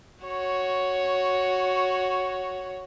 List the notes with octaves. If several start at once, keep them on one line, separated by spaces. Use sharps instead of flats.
F#4 C#5